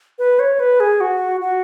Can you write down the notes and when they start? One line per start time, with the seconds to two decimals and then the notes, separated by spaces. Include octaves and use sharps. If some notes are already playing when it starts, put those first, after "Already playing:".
0.19 B4
0.39 C#5
0.60 B4
0.80 G#4
1.01 F#4
1.41 F#4